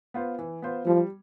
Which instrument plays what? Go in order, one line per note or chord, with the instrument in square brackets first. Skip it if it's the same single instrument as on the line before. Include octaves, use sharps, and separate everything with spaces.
[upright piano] B3 F4 C5
E3
B3 F4 C5
[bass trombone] F3 [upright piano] G3